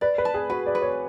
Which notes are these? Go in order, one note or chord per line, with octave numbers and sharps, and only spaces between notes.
B4 D5
B4
A5
G#4
F#4 B4
D5
B4
C#5